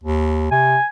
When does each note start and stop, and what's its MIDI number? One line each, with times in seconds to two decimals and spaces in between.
0.03 0.50 39
0.51 0.77 48
0.51 0.86 80